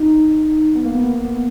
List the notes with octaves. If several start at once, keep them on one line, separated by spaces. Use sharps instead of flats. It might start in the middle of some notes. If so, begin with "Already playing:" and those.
Already playing: D#4
B3
A#3
B3
A#3
B3